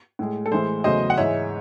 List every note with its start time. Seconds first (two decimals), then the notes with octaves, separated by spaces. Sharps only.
0.19 A2 G#3
0.46 A4
0.52 A2 E3 G#3 C5
0.84 E2 C#3 F#3 A3 C5 D#5
1.10 F#5
1.17 G#2 E3 G#3 C#5 E5